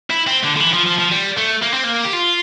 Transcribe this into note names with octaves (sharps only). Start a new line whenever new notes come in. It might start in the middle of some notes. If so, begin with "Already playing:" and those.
E4
C4
D3
D3
E3
F3
F3
F3
G3
A3
A#3
C4
A#3
G4
F4